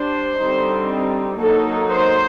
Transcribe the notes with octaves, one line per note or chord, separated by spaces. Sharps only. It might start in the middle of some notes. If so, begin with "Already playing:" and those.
Already playing: G3 D4 C5
D3 G3 C4 D#4
F#3 A#3 D#4 A4
C5